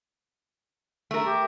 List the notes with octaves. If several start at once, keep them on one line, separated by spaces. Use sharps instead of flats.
A3 A#4
G4